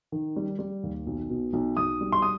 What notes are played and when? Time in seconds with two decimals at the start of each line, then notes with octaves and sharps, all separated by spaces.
0.12 D#3
0.36 G3
0.59 G3
0.83 D#2
1.07 B1
1.30 B2
1.53 B1
1.77 B1 D#6
2.01 G3
2.12 C6
2.22 D#6